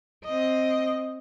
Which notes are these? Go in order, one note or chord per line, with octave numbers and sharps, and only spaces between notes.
C4 D#5